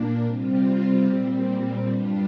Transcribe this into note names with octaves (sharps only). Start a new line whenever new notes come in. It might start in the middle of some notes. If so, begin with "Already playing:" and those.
Already playing: A#2 A#3 D4
C3 G3 C4 F4
A#2 G3 C4
G2 G3 D4 F4